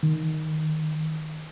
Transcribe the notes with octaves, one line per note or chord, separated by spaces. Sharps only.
D#3